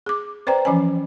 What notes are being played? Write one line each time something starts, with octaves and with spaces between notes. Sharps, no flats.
G#4 D6
B4 C5 D5 G5 A#5
E3 F3 C#4 C#5 G#5